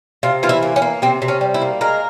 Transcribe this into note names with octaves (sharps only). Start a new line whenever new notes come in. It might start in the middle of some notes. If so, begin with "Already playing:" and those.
C3 F4
E3 F4
E4
A#3
C#4
A#3
C3 C4
C3
C#4
G3
E4
A#3
G#3 A#4